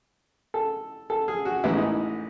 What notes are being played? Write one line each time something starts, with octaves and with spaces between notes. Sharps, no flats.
A4
A4
G#4
F#4
A1 A2 E3 G#3 B3 E4
D#4